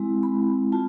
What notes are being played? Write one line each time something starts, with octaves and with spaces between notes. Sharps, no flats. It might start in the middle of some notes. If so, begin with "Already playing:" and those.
Already playing: G#3 C4 E4
B5
F4 A5